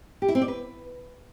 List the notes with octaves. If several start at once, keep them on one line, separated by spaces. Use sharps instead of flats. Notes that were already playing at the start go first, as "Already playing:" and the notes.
G4
E4
C4
D5
B4